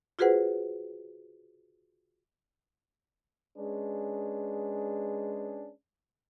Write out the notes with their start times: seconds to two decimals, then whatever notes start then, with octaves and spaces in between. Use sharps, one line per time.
0.19 F4 F#4 G#4 B4 C5 F#5
3.58 G#3 C#4 D4 G#4 B4